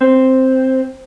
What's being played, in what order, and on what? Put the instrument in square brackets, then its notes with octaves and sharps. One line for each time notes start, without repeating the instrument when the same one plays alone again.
[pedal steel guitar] C4